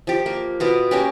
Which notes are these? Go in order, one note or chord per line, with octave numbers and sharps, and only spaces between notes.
F3 G4
A#3
B2 B3 F4
A#3 C#4 G4